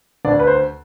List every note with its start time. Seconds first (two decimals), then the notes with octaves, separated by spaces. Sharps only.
0.25 D2 D4 D5
0.40 B4
0.47 C5